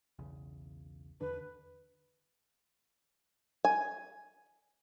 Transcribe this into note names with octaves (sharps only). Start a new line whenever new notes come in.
B1 E2 C#3
E2 D3 D4 B4
G#5